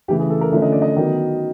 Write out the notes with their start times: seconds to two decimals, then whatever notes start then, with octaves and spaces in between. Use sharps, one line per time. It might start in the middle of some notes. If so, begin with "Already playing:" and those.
0.08 C#3 E3 A3 G4
0.20 G#4
0.30 A4
0.41 A#4
0.52 D3 F3 A3 C#4 E5
0.62 D#5
0.72 D5
0.82 D#5
0.97 D#3 F#3 B3